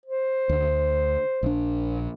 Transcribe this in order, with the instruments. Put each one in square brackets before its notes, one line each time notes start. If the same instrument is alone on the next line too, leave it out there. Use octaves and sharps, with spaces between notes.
[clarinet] C5
[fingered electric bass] D2
A#1 D4